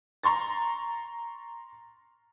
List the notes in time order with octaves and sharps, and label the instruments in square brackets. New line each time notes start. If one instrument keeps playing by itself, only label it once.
[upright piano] A#5 C6 C#6 A6